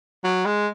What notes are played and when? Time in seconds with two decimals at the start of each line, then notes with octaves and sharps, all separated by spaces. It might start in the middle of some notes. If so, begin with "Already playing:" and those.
0.24 F#3
0.45 G#3